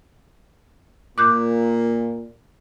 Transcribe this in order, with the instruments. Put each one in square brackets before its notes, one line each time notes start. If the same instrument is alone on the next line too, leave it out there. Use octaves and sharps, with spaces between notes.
[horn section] A#2 [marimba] D6 F#6 G6